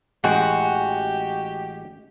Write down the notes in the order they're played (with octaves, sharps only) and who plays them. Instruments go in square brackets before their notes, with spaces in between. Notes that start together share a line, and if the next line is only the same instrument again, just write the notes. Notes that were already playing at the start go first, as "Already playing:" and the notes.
[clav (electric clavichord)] A1 G#3 G5 [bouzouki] F#4 [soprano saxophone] G4